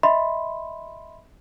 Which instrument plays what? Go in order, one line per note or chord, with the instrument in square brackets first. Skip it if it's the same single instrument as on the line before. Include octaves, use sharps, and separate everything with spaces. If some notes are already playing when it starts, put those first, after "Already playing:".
[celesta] D#5 E5 B5 C6